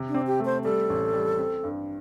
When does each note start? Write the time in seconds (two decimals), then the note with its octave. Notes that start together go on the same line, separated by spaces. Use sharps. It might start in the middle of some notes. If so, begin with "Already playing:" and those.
Already playing: C3
0.09 D4
0.14 C4
0.27 G4
0.40 A3
0.45 C5
0.64 G3 A4
0.90 A1
1.13 G3
1.39 C4
1.64 G2